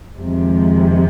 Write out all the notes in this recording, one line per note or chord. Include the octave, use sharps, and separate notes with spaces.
F2 C3 D#3 G#3